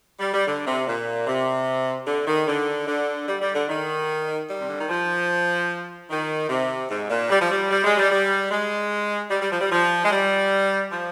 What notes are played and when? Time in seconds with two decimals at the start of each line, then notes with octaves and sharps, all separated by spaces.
0.20 G3
0.34 G3
0.47 D3
0.67 C3
0.87 A#2
1.27 C3
2.07 D3
2.27 D#3
2.47 D3
2.87 D3
3.28 G3
3.41 G3
3.55 D3
3.69 D#3
4.49 G3
4.59 C3
4.70 D3
4.79 D#3
4.90 F3
6.10 D#3
6.49 C3
6.91 G#2
7.10 A#2
7.30 G3
7.41 F3
7.52 G3
7.71 G3
7.84 G#3
7.98 G3
8.11 G3
8.51 G#3
9.31 G3
9.42 G3
9.52 F3
9.61 G3
9.72 F3
10.05 G#3
10.12 G3
10.92 F3